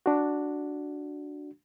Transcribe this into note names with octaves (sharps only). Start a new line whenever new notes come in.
D4 F#4